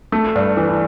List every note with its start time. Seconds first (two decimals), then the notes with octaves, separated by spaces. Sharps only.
0.12 A3
0.35 G2
0.57 E3